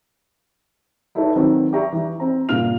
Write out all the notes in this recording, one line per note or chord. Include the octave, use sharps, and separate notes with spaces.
D#4 E4 F#4 A4 B4 C#5
D#3 F#3 C4
G4 D5 E5 A#5 C#6
E3
C4 A#5
G2 A#2 C#3 F4 F6 F7